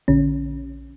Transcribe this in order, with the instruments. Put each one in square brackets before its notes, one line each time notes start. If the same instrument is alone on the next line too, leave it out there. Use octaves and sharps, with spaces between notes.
[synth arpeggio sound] A#1 D3 C#4